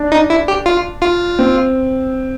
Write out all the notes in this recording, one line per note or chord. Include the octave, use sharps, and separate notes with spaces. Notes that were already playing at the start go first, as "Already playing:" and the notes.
Already playing: D4
D#4
E4
G4
F4
F4
C4